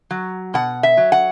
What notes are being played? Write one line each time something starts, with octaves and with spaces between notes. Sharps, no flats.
F#3
B2 F#5
E5
F#3
F#5